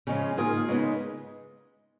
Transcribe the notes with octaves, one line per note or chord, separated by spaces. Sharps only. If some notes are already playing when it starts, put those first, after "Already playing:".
C#3 F3 G#3 C#4
G#2 D#3 A#3 F4 G#4
C#3 G#3 B3 D#4